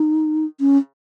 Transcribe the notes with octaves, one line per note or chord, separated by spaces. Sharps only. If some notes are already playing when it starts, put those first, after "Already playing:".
Already playing: D#4
C#4